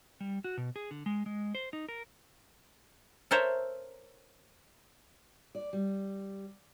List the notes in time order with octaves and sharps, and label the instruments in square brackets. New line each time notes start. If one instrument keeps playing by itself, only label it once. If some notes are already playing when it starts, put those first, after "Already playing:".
[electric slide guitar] G3
F#4
B2
G#4
D3
G#3
G#3
C5
D#4
A#4
[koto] A4 A#4 C5 C#5 E5
[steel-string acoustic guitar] D5
G3